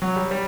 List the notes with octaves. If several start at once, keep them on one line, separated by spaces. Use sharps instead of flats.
F#3
G3
G3